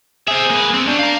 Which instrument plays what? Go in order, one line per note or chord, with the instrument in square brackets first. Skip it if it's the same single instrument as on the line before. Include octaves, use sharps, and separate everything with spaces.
[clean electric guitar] G#4 [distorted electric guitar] C5 E5
[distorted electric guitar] A#3 B4
B3 C4
[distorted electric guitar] C#4 G4 [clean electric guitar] D4
[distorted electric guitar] F5 A#5